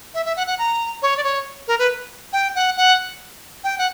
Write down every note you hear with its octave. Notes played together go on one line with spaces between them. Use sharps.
E5
E5
F#5
F#5
A#5
C#5
D5
C#5
A#4
B4
G5
F#5
F#5
G5
F#5